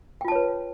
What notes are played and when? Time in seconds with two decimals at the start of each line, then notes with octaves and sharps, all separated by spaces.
0.21 G5
0.25 F4
0.28 A5
0.32 C#5
0.35 B4